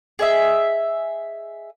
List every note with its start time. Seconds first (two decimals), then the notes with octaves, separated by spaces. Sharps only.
0.19 G#4 D#5 E5